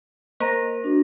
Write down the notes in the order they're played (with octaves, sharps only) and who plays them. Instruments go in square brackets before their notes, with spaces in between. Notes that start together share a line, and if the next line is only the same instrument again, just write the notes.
[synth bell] A#3 A#5 A#6 [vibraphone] A#4 C5
[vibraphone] D4 F#4